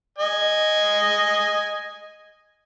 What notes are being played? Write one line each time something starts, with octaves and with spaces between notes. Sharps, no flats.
D#5 G#5